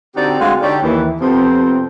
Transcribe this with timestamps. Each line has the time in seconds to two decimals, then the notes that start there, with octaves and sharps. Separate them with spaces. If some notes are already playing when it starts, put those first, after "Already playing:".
0.16 D3 C4 D#4 F#4 G4 D5
0.39 D2 G#3 C4 F#4 F5
0.62 D3 D#4 G4 C#5 D5
0.82 D#2 E3
1.20 F2 C3 F3 B3 C4